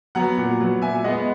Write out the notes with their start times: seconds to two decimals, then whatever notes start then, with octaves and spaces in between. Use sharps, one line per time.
0.15 F#3 B3 F#5 A#5
0.37 A#2
0.60 F#3 B3
0.82 A#2 E5 G#5
1.04 G#3 B3 D#5 F#5